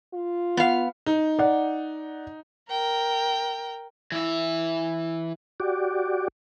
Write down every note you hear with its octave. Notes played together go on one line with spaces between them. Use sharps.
F4
B3 F5
D#4
D5 F#5
A#4 G5
E3 E5
F#4 G4 D5